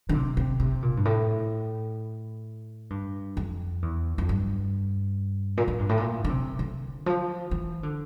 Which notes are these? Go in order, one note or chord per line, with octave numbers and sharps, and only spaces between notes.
D3
C3
C3
C3
A#2
G2
A2
G2
F2
E2
F2
G2
A#2
A2
G2
A2
A#2
D3
C3
D3
F3
E3
D3